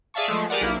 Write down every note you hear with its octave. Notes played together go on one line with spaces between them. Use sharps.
G#4 D5 E5 F5 A5 C#6
F3 G#3 A3
G4 G#4 A#4 D5 F#5
B1 A#3 E4